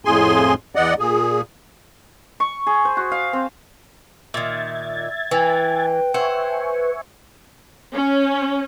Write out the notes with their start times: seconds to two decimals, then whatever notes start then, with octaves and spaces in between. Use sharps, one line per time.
0.05 F2 A2 G#4 G#5 C6
0.75 E2 D5 D#5 F#5
0.99 A#2 G#4
2.40 C#6
2.67 G#4
2.85 C5
2.97 F#4
3.12 F5
3.33 C4
4.34 A#2 D#3 E5 G#6 A6
5.31 E3 B4 G5
6.14 B4 C5 E5 F#5 G#5 C#6
7.94 C#4